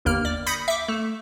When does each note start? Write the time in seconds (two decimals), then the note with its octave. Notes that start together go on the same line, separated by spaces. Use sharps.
0.05 G1 D#2 A#3 F6
0.25 D5
0.46 B5 D#6 G6 A#6 B6 C#7
0.68 E5 D6
0.88 A3